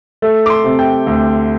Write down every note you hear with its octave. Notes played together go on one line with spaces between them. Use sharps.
A3
D6
C6
C3
G5
D2